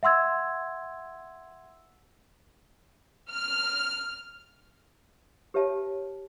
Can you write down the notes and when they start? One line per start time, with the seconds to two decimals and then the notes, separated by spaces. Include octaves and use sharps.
0.03 E5 F#5 C6 E6 G#6
3.30 F6
5.54 G4 B4 C#5 E5 A5